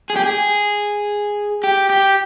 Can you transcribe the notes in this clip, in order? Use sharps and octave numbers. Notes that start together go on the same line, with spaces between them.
G#4
G4
G#4
G4
G4